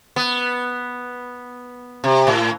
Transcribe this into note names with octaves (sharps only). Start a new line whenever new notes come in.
B3
C3
A2